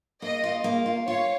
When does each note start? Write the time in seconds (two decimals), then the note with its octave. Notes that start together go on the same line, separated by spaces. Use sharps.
0.22 A#3 D#5
0.44 F4
0.64 A#3
0.86 F4
1.07 F4 C#5